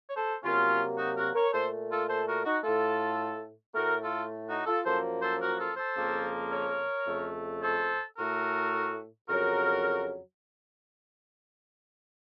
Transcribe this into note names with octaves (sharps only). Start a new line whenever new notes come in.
C#5
A4 C5
C3 F#3 A#3 C#4 F4
D#4 F#4
F#4 A#4
A#4 C#5
A#2 A3 A4 C5
F4 A4
A4 C5
F#4 A#4
D#4 F#4
A2 A3 F4 A4
A2 A3 F#4 A#4
F4 A4
D#4 F#4
F4 A4
F#2 F3 A#3 A4 C5
A4 C5
F#4 A#4
F4 A4
A4 C5
F2 C#3 F3 A#3
A#4 C#5
F2 C#3 A3
A4 C5
A2 A3 F#4 A#4
F2 C#3 F#3 F#4 A#4